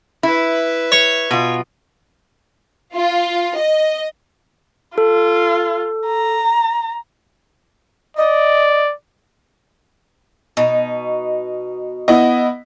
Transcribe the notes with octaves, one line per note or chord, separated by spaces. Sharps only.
E4 B4 E5
C#5
B2 F4
F4
D#5
F4 A4
A#5
D5 D#5
B2 D#4
B3 E4 D#5